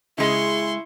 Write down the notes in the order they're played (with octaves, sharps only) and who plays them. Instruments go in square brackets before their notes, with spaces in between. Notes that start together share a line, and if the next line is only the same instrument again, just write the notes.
[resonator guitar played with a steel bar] C#3 G#3 G#4 [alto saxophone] E4 [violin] C6 C#6